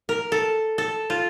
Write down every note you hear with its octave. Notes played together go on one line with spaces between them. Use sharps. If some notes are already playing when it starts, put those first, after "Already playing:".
A#4
A4
A4
F4